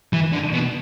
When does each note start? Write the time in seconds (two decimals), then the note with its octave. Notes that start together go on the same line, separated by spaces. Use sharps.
0.13 E3
0.32 D3
0.53 B2